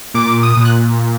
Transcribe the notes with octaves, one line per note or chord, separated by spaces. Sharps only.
A#2 D6
D#6
A#2
F#6